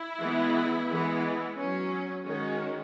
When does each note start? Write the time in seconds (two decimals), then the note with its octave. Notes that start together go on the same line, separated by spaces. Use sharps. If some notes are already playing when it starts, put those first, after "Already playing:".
Already playing: E4
0.21 E3 G#3 B3
0.88 E3 G#3 B3
1.57 F#3 C#4
2.25 D#3 G#3 C#4 F#4